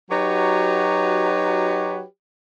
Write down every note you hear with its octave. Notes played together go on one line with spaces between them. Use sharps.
F#3 D#4 F#4 G4 B4 C#5